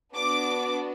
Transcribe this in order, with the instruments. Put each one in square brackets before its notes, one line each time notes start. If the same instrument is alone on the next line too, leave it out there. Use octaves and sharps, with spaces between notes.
[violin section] B3 D4 F#4 D6